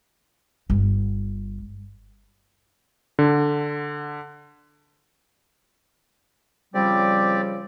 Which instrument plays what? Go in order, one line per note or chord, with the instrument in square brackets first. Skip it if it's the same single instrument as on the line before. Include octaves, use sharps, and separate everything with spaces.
[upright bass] G1
[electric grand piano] D3
[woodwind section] C#3 F3 G3 [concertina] C4 G4 D5